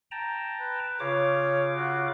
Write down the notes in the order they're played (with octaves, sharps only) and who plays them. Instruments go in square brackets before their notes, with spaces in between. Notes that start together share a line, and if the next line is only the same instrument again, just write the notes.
[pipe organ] G5 A5 A#5
[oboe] B4
[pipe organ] C#3 F4 D6 [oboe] C#5
[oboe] F#4